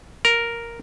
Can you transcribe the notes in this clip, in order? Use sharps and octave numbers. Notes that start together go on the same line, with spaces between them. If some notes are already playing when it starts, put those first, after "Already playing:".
A#4